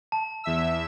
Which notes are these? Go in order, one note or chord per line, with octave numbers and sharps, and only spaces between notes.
A5
E2 E5 E6